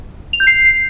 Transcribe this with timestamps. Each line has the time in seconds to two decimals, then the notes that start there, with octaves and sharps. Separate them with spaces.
0.33 F7
0.40 G6
0.47 C7